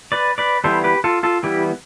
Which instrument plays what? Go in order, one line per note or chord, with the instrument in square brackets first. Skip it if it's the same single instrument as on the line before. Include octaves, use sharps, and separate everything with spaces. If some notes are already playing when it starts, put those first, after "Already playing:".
[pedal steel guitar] B4 D5
B4 D5
E3 G3 B3 A4 C5
G4 B4
F4 A4
F4 A4
E3 G3 B3 E4 G4